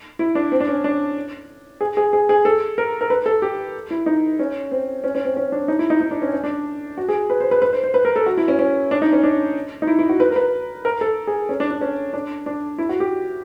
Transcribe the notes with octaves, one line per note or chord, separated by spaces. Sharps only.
E4
D4
C4
D4
C#4
D4
G#4
G#4
G#4
G#4
A4
A#4
A#4
B4
A4
G4
E4
D#4
C#4
C4
C#4
C#4
C4
C#4
D4
D#4
E4
D#4
D#4
D4
C#4
C#4
D4
F#4
G#4
B4
C5
B4
B4
C5
C5
B4
A#4
A4
F#4
E4
C#4
C#4
D4
D#4
C#4
D4
D#4
E4
E4
F#4
B4
A#4
B4
A#4
A4
G#4
C#4
D4
D4
C#4
D4
D4
E4
F#4
G4